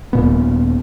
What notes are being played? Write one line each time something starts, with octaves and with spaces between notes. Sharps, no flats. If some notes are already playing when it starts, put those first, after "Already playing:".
D#1 A#2 B3